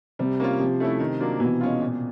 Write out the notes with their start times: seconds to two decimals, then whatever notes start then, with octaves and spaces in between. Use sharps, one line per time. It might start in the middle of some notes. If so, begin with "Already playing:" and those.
0.19 C3 G3
0.40 A#3 C#4 F4
0.59 C3 F3
0.80 A3 C#4 E4
1.00 D#3
1.20 F#3 A#3 D4 F4
1.40 B2 E3
1.61 G#3 C#4 F4
1.81 A#2